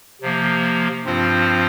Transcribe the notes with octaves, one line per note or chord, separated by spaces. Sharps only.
C3 F3 A#3
G2 F3 C4 F4 C5